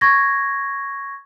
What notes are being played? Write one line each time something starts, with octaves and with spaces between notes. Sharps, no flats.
C#6 G#6 A#6